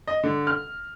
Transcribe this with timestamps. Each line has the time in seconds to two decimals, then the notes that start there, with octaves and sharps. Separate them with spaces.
0.07 D#5
0.23 D3
0.47 F6